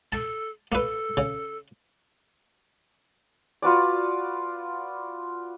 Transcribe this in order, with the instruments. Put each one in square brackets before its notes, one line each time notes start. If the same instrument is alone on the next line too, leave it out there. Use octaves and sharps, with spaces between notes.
[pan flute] A4 [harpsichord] A5
[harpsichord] A#3 B4 [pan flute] A4
[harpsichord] C#3
[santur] F4 F#4 B4 D5